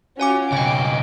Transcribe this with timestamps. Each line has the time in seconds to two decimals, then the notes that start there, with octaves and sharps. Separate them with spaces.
0.20 C#4 F4 F#4 C#5 G#5 D6
0.53 C#2 B2 D#5 G5 G#5 D6